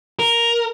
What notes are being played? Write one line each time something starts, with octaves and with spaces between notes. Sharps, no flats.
A#4